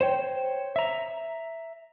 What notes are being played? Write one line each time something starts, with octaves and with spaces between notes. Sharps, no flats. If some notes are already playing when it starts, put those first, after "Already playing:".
C5 C#5 G5
E5 A#5